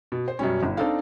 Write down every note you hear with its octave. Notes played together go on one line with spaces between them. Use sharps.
B2
C5
F#2 B2 G3 C#4
G1 E4
C4 D4 D#4 A4 F5